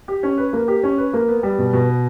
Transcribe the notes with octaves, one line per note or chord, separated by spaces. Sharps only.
G4
C#4
B4
A#3
G4
C#4
B4
A#3
B3
G3
B2
B2
B3